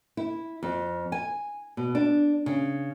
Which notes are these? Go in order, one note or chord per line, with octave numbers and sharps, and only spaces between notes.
E4
F2
G#5
B2
D4
C#3